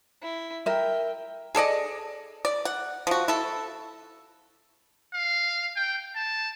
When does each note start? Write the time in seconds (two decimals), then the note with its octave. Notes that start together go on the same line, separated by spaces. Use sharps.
0.22 E4
0.66 A#4 E5 G5
1.55 G#4 A4 D5 D#5
2.45 D5
2.65 F#5
3.07 F3 F#4
3.28 E4 A4
5.14 F5
5.76 G5
6.16 A5